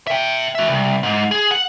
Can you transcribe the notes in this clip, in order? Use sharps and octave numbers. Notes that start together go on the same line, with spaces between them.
E5 G5
F#4 E5
C2
G#2
G#4
F#5